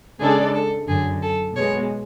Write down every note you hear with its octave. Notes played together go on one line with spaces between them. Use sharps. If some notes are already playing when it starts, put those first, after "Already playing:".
C#3 G#3 D4 G#4 A4 D5
A4
F#2 D3 F#3 G#4
A4
B2 G#3 B3 C#5